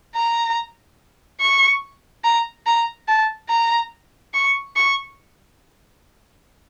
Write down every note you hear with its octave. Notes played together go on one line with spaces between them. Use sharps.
A#5
C#6
A#5
A#5
A5
A#5
C#6
C#6